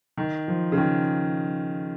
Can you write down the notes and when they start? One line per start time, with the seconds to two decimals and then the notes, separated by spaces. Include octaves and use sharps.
0.17 D#3
0.48 F3
0.72 C#3
0.78 D#3